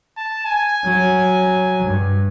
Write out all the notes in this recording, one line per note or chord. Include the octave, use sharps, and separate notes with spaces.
A5
G#5
F#3
G2